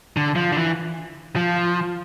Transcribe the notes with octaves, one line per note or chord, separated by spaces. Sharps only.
D3
F3
D3
E3
F3